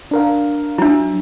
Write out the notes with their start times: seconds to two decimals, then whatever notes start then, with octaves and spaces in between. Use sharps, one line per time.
0.11 D4 A#4 F5
0.78 F#3 D4 E4 E5